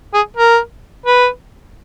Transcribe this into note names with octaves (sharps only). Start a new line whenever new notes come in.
G#4
A#4
B4